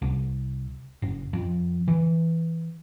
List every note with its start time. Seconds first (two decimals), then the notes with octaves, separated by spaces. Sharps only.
0.02 C2
1.02 F#1
1.33 F2
1.88 E3